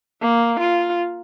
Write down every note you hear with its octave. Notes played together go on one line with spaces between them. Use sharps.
A#3
F4